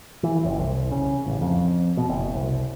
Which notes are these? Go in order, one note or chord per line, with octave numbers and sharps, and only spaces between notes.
E3
F#1
C2
C#3
A1
F2
B2
F#1
C2